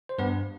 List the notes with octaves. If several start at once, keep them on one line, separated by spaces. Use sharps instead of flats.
C5
G2 B3 B4